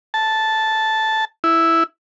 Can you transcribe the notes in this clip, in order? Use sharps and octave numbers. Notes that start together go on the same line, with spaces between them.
A5
E4